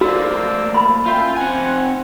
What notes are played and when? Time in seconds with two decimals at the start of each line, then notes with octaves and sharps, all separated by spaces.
0.01 A3 A#3 F#4 C5 D5 E6
0.74 B5 C6
1.06 C#4 F4 E5 G5
1.36 C4 F#5 G#5